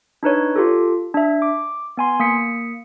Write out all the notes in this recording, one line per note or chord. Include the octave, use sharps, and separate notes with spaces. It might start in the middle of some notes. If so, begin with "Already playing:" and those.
D4 D#4 B4 C#5
F4 G4 A4
D4 E5
D6
B3 G#5 C6
A#3 D#6 B6 C#7